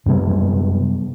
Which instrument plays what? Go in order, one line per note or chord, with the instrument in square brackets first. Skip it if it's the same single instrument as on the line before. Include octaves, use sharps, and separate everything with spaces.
[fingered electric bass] F#2 C3 G3 B3